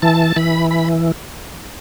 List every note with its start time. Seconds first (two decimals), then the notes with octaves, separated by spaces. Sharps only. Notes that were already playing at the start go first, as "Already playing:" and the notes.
0.02 E3 A5
0.36 E3 B5
0.71 B5